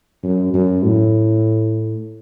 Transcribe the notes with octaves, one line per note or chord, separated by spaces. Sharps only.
F#2
F#2
A2